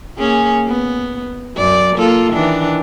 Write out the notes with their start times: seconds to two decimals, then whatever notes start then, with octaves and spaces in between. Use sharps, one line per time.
0.18 A#3 C#4 G#4
0.68 B3
1.56 F#2 D5
1.96 A#3 F4 A4
2.33 D#3 E3 D4